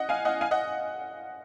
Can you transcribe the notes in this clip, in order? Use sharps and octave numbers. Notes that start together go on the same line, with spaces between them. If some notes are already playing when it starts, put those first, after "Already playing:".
Already playing: D#5 F#5
F5 G#5
D#5 F#5
F5 G#5
D#5 F#5